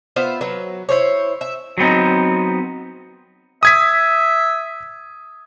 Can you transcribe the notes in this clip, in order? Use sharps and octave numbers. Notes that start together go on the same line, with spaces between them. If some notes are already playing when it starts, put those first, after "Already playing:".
B3 F4 C5 E5
F#3 B4
E4 C5 C#5
E5
F#3 B3 C4 D#4
E5 D#6 G#6 B6